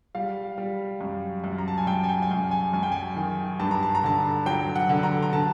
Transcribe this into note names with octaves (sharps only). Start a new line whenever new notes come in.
G3 F5
G3
F#2
F#2
A#5
A5
G#5
F#2 G5
G#5
G5
G#5
F#2 G5
G#5
F#2 G#5
G5
G#5
D#3
G2 A5
A#5
A5
A#5
D3 A5
F#3 G5
F#5
D3
A#5
A#5
D3 A5